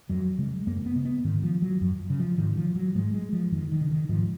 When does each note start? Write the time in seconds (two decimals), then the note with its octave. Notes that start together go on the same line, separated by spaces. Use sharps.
0.09 F2 F#3
0.38 C#3 G#3
0.67 F#2 A#3
0.86 B3
0.96 C#3
1.05 B3
1.25 G#2 D#3
1.43 F3
1.62 F#3
1.81 F#2
2.10 C#3
2.20 F3
2.38 G#2 D#3
2.57 F3
2.76 F#3
2.95 G#2 G#3
3.14 G#3
3.33 F3
3.52 F2 D#3
3.71 D#3
3.81 C#3
3.90 D#3
4.09 G#2 F3